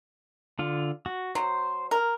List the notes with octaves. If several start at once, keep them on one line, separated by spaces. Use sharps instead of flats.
D3 F4
F#4
F#3 C5
A#4